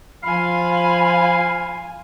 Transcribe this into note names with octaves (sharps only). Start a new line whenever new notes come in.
F3 F4 F5 G#5 B5